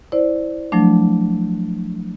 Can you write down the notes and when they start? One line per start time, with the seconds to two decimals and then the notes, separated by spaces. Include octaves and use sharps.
0.12 E4 C5 D5
0.72 F3 F#3 A3 D4